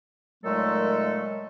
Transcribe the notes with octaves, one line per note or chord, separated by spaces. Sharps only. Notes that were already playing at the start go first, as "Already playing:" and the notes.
A#2 D#3 F#3 G#3 A3 A4